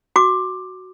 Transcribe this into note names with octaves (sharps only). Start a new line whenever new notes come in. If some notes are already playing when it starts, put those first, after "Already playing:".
F#4 D6